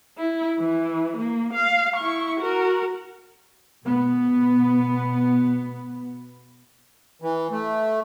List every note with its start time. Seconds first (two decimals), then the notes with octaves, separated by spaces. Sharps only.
0.18 E4
0.60 E3
1.17 A#3
1.53 F5
1.96 E4 C#6
2.40 F#4 A#4
3.84 B2 B3
7.22 E3
7.51 A3